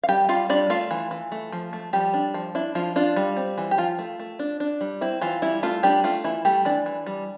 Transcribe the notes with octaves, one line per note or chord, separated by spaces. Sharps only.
F5
G3 G4 G5
G3 F4 F5
G3 D4 D5
A3 F4 F5
E3
E3
A3
F3
A3
F3 G3 G4
D4
F3
D4 E4
F3 F4
D4 F4
G3
C4
E3
G4
F3 F4
A3
A3
D4
D4
G3
C4 E4
E3 F4
G3 E4
A3 F4
G3 D4 G4
A3 F4
E3 E4
G3 A3 G4
E3 D4 D5
E3
G3